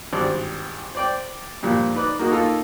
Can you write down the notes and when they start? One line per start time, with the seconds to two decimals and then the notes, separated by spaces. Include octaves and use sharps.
0.13 G#1 G2 C5 D5
0.95 C5 D5 G5
1.63 G2 A#2 F3
1.95 D#4 B4 D5 D6
2.19 A#3 D#4 F#4 G#4
2.32 A#3 D#4 F4 A4